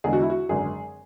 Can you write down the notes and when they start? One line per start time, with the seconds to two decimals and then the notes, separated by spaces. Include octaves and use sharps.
0.04 E2 D3 G#3 G#4
0.13 F#4
0.22 E4
0.30 F#4
0.49 G#1 F#2 D3 G#4